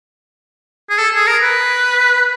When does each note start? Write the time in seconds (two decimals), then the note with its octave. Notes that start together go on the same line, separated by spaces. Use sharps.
0.90 G#4
0.99 A4
1.14 G#4
1.27 A#4
1.42 B4